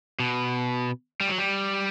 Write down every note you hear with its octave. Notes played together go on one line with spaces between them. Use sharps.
B2
G3
F#3
G3